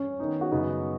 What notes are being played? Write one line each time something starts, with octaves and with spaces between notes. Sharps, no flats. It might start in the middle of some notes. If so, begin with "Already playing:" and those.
Already playing: C#4
D#3 B3 D#4
F#4
F#2 C#3 B3 D#4